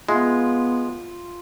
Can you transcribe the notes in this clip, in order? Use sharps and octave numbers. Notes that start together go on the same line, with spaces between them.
G#3 B3 F4